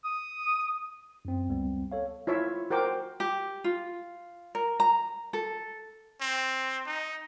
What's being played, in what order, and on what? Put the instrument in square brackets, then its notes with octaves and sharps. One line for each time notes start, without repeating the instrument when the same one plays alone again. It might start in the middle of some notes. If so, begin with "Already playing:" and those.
[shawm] D#6
[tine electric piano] F#2 C4
C#2 G3 B3 C4
A4 C#5 F5
[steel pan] E4 F4 C#5 E5
F#4 A#4 C5 G5 D6
[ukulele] G4
F4
A#4
A#5
A4
[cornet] C4
D#4